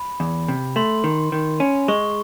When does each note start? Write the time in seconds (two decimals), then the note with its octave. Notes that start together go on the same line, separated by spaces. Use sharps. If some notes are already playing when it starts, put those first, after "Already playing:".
Already playing: B5
0.20 E2
0.48 C3
0.76 A3 C6
1.04 D#3
1.32 D#3
1.60 C#4
1.88 G#3 C#6